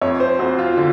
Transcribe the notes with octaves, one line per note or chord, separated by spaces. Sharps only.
F2 C#5
C5
F2 F#4
F4
D3 F4